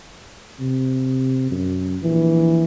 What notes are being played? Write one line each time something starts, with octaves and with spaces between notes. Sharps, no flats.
C3
F#2
A#1 E3